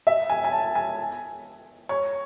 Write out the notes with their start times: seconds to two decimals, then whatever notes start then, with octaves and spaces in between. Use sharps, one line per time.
0.07 E5
0.30 G#5
0.44 G#5
0.52 A5
0.75 G#5
1.89 C#5